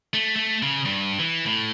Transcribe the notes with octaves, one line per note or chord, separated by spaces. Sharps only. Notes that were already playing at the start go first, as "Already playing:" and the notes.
A3
A3
C#3
G2
E3
A2